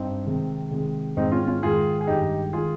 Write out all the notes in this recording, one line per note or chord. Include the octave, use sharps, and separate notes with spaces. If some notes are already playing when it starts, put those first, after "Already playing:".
Already playing: G2 C4 D#4
C3 D#3 G#3
C3 D#3 G#3
G#2 D#3 G#3 C4 D#4
C#4 F4
C#4 F4
G#2 D#3 G#3 F4 G#4
G#4
G2 D#3 G#3 D#4 G4
D#3 G#3 F4 G#4